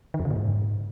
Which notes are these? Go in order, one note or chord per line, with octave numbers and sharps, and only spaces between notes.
D#3
F2
C#3
A#2
G#2